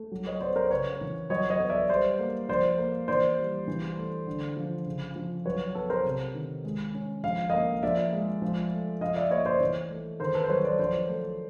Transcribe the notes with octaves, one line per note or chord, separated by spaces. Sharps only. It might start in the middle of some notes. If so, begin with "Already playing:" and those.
Already playing: A3
F#3
C#5 D#5
B3 C5 D5
A#4 C5
D5
C#3 B4 C#5
E3
F#3 C#5 D#5
C#5 D#5
B3
D5 E5
G3 C5 D5
A#3
F3 C5 D5
A#3
E3 C5 D5
G3
E3
A3
D3
F3
C#3
F3
F#3 B4 C#5
B3 A4 B4
A#4 C5
C3
D#3
G#3
C#4
F3 F5
A#3 D#5 F5
F3 D5 E5
G#3
F3
A3
F3 D#5 F5
D5 E5
A#3 C#5 D#5
C5 D5
E3
A3
D#3 A#4 C5
A4 B4
C5
F#3 B4 C#5
C5 D5
F3 C5 D5
A3